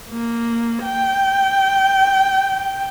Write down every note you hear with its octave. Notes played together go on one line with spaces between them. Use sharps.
A#3
G5